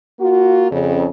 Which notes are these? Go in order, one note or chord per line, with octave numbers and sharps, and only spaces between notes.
A#3 F4 F#4
F2 C#3